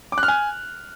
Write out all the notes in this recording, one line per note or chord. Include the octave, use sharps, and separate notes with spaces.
D6
F#6
F6
G#5